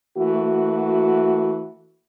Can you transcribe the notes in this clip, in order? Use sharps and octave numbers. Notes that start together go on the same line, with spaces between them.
E3 A3 A#3 F#4